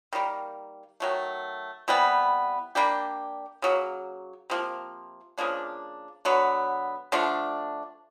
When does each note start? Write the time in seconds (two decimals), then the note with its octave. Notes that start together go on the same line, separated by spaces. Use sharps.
0.13 D#3 G3 A#3
1.00 D#3 F#3 A3
1.88 C3 E3 G3 B3
2.75 G3 A#3 D4 G4
3.62 C#3 F#3 A#3
4.50 C3 F3 A#3
5.38 C#3 F3 A#3 D4
6.25 D3 F#3 B3
7.12 D3 F3 A3 D4